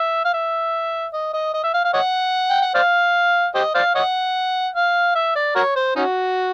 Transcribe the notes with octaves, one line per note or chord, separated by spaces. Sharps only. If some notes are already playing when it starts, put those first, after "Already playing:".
Already playing: E5
F5
E5
D#5
D#5
D#5
E5
F5
F5
C#5 D#5 F#5
G5
F#5
C5 D5 F5
G4 C5 D#5
C5 D5 F5
C#5 D#5 F#5
F5
E5
D5
F#4 A#4 C#5
C5
C#4 D#4 F#4